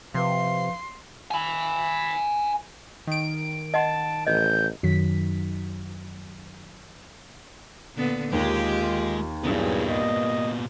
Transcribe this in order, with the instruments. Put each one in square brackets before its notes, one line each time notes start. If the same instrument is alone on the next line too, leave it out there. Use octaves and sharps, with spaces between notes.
[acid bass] C3 [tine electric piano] F3 B4 [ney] F5 [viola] C6
[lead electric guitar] G#5 B5
[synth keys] D#3 D7
[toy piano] D#5 F#5 C6 [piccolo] A5
[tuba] A1 [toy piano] D#5 [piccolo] G6
[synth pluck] F#2 D#3 F#3 B6
[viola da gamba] A#2 D3 B3
[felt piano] D#2 [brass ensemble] D#3 F4 [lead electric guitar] G#3 [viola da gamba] G4
[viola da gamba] G2 [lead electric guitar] A#2 B3 [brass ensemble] F#3 E4 G#4
[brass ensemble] A#3 D#5